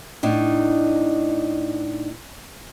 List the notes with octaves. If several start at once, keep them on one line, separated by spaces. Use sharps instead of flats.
A2 D4 D#4